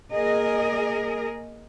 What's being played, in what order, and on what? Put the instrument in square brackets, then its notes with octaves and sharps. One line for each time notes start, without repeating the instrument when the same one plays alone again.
[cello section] A#3 G#4 A#4 D#5